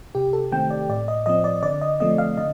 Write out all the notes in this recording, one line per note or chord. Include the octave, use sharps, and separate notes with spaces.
C3 G4
A4
D#3 A3 C4 G5
D5
A2 D5
D#5
F3 C4 D#5
D5
D3 D5
D#5
F3 A3 C4 D#5
F5
D3 D#5